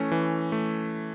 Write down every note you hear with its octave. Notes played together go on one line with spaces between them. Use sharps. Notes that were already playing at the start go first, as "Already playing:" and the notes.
Already playing: E3 A3 C#4
E3
A3